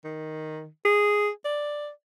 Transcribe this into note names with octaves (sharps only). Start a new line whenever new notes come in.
D#3
G#4
D5